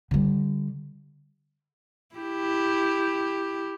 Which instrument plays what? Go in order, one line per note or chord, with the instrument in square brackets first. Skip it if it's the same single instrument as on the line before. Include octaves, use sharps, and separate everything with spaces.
[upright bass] D3 G3
[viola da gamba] E4 G4